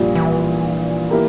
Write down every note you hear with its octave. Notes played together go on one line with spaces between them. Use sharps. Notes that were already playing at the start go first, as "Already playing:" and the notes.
Already playing: A#1 A#2 G3
E3
A#3 E4 G4 A#4